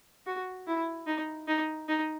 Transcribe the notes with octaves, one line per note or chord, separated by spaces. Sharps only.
F#4
E4
D#4
D#4
D#4